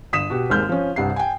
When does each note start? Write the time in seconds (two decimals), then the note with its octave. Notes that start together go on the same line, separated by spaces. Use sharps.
0.13 G1 D#6 B6 E7
0.30 B2 F#4 G4
0.49 G#1 D#2 G#3 F6 G6
0.69 F3 C#4
0.96 C2 G2 F#5 C7
1.16 G5 G#5